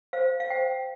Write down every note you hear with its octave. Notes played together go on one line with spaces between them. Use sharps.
C5 F5
F5
C5 G5